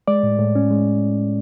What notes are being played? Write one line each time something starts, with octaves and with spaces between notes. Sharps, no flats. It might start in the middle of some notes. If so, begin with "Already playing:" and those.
G#3 D5
A2
A2
C#4
G#3